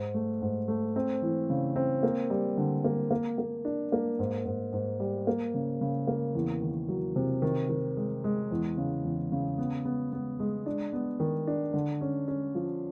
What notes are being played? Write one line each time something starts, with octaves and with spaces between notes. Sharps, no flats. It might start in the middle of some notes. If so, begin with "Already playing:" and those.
Already playing: G#2
A3
G#2
A3
C4
E3
C#3
C4
A#3
G3
D3
A#3
A#3
A#3
D4
A#3
G#2
G#2
G#2
G3
A#3
C#3
C#3
A#3
E2
D#3
F#3
C3
D#3
D#3
G#3
G#3
E2
C#3
E2
C#3
B3
B3
B3
G#3
D4
B3
D#3
D4
D3
C#4
C#4
F3